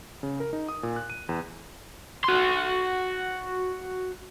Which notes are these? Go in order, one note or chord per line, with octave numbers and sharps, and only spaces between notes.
C#3
A#4
D#4
D#6
A#2
F#6
D#7
E2
F#4 C6